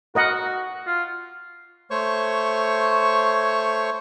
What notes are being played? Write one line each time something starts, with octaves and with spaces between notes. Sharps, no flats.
F#4 A#4 D#5 F#5
F4
A3 C5 C#5 C#6